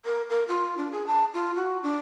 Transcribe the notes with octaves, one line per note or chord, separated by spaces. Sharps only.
A#4
A#4
F4
D4
G#4
A5
F4
F#4
D4